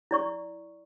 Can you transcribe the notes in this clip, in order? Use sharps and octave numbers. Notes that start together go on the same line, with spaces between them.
E4 D5 C#6